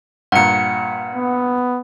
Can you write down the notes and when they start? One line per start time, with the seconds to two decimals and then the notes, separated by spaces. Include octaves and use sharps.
0.32 G2 A#2 F#5 C#7
1.16 B3